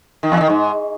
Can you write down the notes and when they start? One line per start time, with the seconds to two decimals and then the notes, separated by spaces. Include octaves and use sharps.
0.23 D#3
0.32 E2
0.41 D#3
0.49 G#2